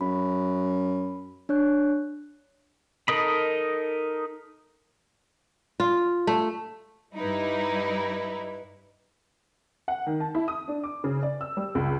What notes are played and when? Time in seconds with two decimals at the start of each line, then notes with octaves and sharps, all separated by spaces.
0.01 F#2 B5
1.49 D4 C#5 F#6
3.08 D#4 A4 A#4 D#5 B5
5.80 F4
6.27 A3
7.15 G2 G3 D#4 E4 B4
9.88 F#5
10.07 D#3
10.20 A5
10.35 E4
10.48 D#6
10.68 D4
10.83 D6
11.04 C#3
11.23 D5
11.41 E6
11.57 G3
11.75 C#2